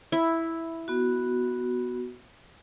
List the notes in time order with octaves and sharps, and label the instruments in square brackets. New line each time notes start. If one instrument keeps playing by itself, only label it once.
[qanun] E4
[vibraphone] B3 F#4